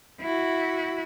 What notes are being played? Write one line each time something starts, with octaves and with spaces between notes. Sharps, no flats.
E4 F#4